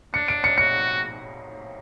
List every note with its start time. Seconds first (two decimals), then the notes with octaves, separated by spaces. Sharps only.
0.14 D4 C#7
0.28 D7
0.44 C#7
0.58 F#4 C#7